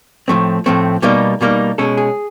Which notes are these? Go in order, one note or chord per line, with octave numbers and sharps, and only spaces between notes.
A2 F3 A3 C4
A2 F3 A3 C4
B2 G3 A#3 D#4
B2 G3 A#3 D#4
B2 G#3 C#4 A4
G#4